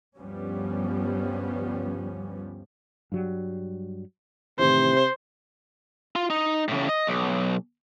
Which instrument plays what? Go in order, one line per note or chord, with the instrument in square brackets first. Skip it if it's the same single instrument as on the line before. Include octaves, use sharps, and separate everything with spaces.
[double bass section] D2 G2 F3 G3 B3 C#4
[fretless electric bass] G2 F#3 G3
[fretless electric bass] A2 D#3 E3 [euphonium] C3 [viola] C5
[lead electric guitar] F4
D#4
A2 C#3
D#5
B1